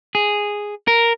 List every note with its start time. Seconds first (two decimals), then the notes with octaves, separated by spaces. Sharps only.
0.15 G#4
0.88 A#4